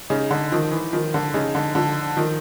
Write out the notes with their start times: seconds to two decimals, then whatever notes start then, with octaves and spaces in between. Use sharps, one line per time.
0.10 C#3 D#4
0.31 D3
0.52 D#3 F3
0.72 E3
0.93 D#3 F3
1.14 D3
1.34 C#3 D#4
1.55 D3
1.75 D3 F3
2.17 D#3 F3